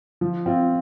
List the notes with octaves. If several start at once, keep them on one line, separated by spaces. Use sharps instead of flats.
F3
C4 F4